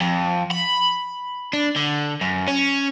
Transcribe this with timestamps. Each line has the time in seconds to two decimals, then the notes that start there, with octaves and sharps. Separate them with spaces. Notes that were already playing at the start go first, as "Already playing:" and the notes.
0.01 F2
0.51 B5
1.53 D4
1.76 D3
2.21 F#2
2.48 C#4